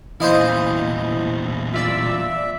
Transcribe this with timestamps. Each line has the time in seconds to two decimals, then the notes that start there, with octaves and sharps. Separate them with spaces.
0.20 E2 A#2 E4 C5 D#5 F5
1.74 F4 D5 E5 E6